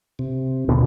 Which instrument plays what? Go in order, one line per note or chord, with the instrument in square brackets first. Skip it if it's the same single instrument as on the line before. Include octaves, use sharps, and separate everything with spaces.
[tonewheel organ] C3
[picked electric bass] D#2 B2 D3